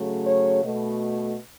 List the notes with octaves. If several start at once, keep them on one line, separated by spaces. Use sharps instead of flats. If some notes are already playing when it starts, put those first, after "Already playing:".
Already playing: C#3 F#3 A3
C#5
B2 A3